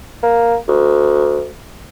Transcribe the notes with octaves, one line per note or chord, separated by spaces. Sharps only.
A#3
D2